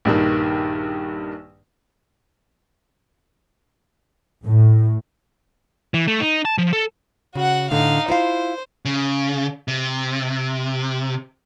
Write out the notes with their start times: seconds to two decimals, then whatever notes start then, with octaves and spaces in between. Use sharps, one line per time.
0.05 A#1 G2 D#3
4.44 A2
5.94 E3
6.08 A3
6.20 D#4
6.45 A5
6.58 F3
6.73 A4
7.35 C#3 F#4 F#5
7.71 A2 D3 D#4 F5
8.09 E4 F4 C5 F5
8.85 C#3
9.68 C3